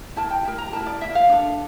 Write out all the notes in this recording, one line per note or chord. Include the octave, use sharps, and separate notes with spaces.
E4 A#4 A5
G5
E4 A#4
A#5
E4 A#4 A5
D5
E4 A#4 E5
F5
D4 A4